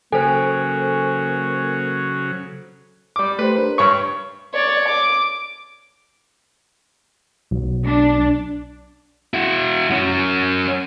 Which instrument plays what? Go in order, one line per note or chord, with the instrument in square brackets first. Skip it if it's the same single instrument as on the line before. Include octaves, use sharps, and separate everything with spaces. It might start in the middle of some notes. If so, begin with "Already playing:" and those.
[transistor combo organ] C#3 F#3 [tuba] A#3 [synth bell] A4 C5 [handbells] G#5
[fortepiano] G3 D6
[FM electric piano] A3 G4 C5 [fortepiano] B4
[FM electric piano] D4 A#4
[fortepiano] G2 C#5 C#6
[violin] C#5 D5
D6
[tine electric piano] B1
[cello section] D4
[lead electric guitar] E4 F#4
F#3 C#4